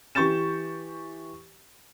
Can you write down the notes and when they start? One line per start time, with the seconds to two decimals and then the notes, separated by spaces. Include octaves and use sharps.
0.15 E3 G4 C#6 G6 A6 E7